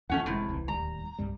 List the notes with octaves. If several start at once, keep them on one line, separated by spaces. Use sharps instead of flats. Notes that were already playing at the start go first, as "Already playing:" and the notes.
E2 A#2 F3 A3 C#4 F#5
E1 A1 A2 C3 G#3
D#1 C2 E3
D1 D#2 G3 A#5
B1 G2 G3